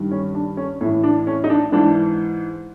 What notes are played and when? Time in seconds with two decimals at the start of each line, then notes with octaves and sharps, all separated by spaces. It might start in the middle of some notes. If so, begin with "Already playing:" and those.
Already playing: G2 D#3
0.11 C#4
0.34 D4
0.57 C#4
0.81 A2 E3 C#4
1.04 D4
1.27 C#4
1.44 D#4
1.50 D4
1.72 G#2 E3 D4